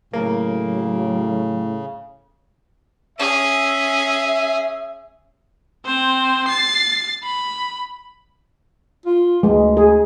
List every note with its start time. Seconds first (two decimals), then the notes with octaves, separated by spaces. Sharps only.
0.13 A2 C#3 F#3 A#3
3.18 C#4 G#4 E5
5.86 C4 C5
6.48 A6 C7
7.23 B5
9.06 F4
9.43 D2 G#3
9.77 G#4